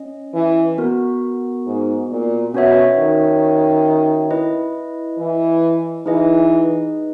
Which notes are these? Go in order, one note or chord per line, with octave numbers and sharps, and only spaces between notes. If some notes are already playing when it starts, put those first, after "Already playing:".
Already playing: C#4 D#5
E3
B3 F#4 A#4
G#2
A#2
B2 C#4 F#4 C#5 E5
D#3
E4 B4 D#5
E3
E3 D#4 G#4 B4 D#5